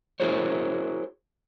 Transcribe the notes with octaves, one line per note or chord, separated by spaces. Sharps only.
E4 F#4 G#4 A#4 C5 C#5